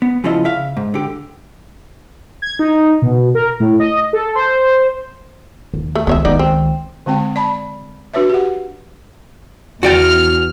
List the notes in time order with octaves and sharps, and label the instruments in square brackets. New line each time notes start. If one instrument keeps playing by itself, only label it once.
[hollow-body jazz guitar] B3
C#3 F3 C#4 E4 F4 D#5
C#3 E5 F5
G#2
D3 G4
[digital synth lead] G#6
D#4
B2
A#4
A2
D#5
A4
C5
[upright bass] D#2
[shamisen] A3
[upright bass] C#2 D#3 [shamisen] B3 C#5 E5
[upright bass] C#2 D#3 [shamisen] B3 D#4 D5
[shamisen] C4
[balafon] D3 G#3 C4 G5
D5 A5 B5
D4 F#4 B4 C#5 E5
G4 F#5
[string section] E2 F6 [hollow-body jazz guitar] F#4 D5 G5